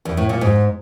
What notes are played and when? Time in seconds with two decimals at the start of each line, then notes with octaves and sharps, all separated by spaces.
0.05 E2
0.17 A2
0.29 A#2
0.41 G#2